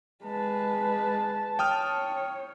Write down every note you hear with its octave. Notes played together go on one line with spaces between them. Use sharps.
G#3 B4 A5
C#5 G5 D#6 F6